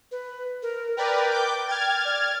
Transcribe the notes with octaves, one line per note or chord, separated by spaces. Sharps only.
B4
A#4
A#4 B4 D5 G5
D6 G6
F6 G#6 A6
D5